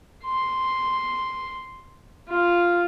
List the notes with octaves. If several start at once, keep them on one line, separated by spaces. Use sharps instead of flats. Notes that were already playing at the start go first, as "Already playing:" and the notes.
C6
F4